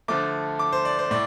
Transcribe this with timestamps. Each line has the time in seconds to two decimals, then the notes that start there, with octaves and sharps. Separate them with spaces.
0.08 D3 F3 A3 D6
0.59 D6
0.72 C5
0.85 D5
0.99 C5
1.11 A2 D5